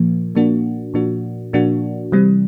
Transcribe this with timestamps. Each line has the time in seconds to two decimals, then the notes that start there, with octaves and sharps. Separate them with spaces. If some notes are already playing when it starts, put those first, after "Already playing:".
Already playing: A#2 F3 A#3
0.35 A#2 F3 A#3 D4 F#4
0.94 A#2 F3 A#3 D4 F#4
1.53 A#2 F3 A#3 D4 F#4
2.12 C3 E3 G3 C4